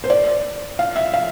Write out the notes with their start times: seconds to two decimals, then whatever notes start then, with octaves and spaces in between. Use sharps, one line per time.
0.04 C5
0.10 D5
0.79 F5
0.96 E5
1.14 F5